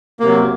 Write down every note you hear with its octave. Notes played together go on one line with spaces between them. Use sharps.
C3 F#3 A#3